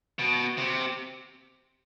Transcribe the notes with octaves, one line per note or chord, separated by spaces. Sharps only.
B2
C3